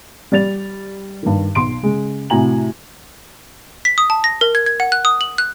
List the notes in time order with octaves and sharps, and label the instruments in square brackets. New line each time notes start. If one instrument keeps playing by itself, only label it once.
[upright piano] G3 D5 A6 F7
G2 D#3
B1 C6 D7
C#3 G#3
A2 C3 F#4 G#5 A#5 F#7
[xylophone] B6
D#6
A5
A#6
A#4
G#6
G#6
F#5
F#6
D#6
F#7
F#6